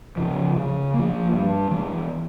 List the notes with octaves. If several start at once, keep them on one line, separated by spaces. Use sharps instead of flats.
C#3 F3
C#3
A#3
F3
G2
E3 G#3 B3